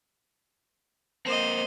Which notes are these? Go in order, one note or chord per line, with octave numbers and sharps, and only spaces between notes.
A#3 C4 C5 D#5